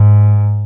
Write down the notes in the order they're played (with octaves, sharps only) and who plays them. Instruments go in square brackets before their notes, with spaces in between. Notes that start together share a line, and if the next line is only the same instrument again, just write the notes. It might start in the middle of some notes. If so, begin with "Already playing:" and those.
Already playing: [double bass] G#2